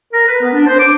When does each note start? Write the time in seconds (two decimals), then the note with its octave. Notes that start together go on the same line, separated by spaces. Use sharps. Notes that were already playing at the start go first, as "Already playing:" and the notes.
0.13 A#4
0.28 B4
0.41 B3
0.53 D4
0.66 C5
0.79 D6